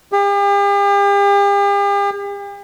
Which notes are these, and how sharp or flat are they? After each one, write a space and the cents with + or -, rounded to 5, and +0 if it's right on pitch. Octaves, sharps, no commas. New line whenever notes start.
G4 +45